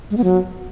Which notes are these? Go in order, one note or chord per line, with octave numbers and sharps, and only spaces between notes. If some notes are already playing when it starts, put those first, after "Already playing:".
G#3
B3
F#3